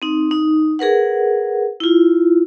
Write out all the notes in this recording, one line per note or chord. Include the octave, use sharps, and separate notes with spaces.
C4 D#4
D#4
G#4 A#4 B4 F#5
E4 F4